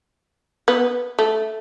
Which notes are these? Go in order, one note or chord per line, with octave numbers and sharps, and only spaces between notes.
B3
A3